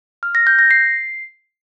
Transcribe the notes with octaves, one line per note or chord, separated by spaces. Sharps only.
F6
A#6
G6
A#6
C7